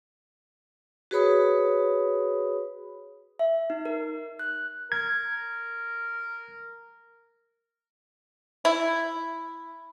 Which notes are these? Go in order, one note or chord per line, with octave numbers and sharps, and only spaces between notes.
F#4 G#4 B4 C#5 B5 D#6
E5
D#4
A#4
F#6
A#4 G#6
E4